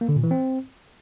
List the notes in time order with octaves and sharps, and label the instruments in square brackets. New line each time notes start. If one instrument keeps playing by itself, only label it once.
[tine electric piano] A#3
D3
A#2
E3
C4